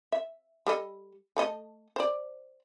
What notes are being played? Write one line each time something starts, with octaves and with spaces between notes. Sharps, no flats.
E5
G3 A4 D#5
A3 A4 D#5
C5 D5